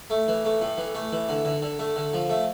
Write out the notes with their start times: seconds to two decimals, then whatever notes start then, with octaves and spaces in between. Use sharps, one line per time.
0.10 A3
0.28 E3
0.45 A3
0.61 A2
0.77 E3
0.95 A3
1.12 E3
1.29 D3
1.45 D3
1.62 D3
1.79 A3
1.96 D3
2.13 F3
2.30 A3